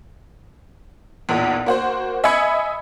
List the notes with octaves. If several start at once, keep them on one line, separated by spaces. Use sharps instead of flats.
B1 E2 A#2
A#3 F#4 C5
D#5 E5 G#5 B5 G#6 C#7